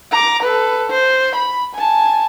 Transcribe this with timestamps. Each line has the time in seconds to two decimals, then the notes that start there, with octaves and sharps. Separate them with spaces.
0.11 A#5 D6
0.43 A4 B4
0.90 C5
1.35 B5
1.75 G#5 A5